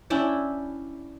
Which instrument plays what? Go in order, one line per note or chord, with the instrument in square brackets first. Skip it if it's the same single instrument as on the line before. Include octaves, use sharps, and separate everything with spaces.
[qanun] C#4 D4 E4 G5